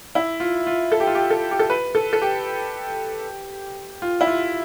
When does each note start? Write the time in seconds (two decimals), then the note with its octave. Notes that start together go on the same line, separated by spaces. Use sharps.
0.15 E4
0.40 F4
0.67 F4
0.92 A4
1.00 G4
1.07 F4
1.15 G4
1.30 A4
1.51 G4
1.59 A4
1.70 B4
1.95 A4
2.13 A4
2.22 G4
4.02 F4
4.21 E4
4.27 F4